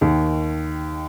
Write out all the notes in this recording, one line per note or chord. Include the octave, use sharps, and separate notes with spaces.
D#2 D#3